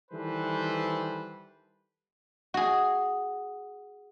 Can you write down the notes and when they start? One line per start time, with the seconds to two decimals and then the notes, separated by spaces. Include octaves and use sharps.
0.11 D#3 E3 G3 A4 B4 C5
2.54 F#4 G#4